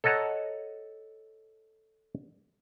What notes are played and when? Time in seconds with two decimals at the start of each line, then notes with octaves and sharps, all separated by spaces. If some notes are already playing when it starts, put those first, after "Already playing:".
0.04 A4 C#5 D#5 F#5 A5 A#5